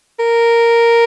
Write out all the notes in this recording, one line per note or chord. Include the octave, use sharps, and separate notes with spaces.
A#4